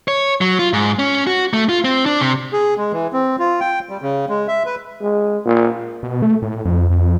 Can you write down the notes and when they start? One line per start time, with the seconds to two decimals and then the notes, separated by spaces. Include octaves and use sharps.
0.08 C#5
0.41 F#3
0.59 F4
0.73 G#2
0.99 C#4
1.27 F#4
1.53 A3
1.69 F4
1.85 C4
2.06 D4
2.21 C3
2.53 G#4
2.77 G#3
2.92 E3
3.13 C4
3.39 F4
3.60 G5
3.89 G3
4.01 C#3
4.29 G#3
4.48 E5
4.66 B4
5.01 G#3
5.45 A#2
6.03 B2
6.22 A3
6.42 A2
6.65 F2
6.90 F2